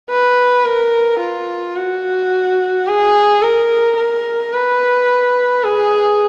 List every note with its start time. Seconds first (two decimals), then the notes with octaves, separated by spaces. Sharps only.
0.10 B4
0.65 A#4
1.20 F4
1.76 F#4
2.87 G#4
3.42 A#4
3.97 A#4
4.53 B4
5.63 G#4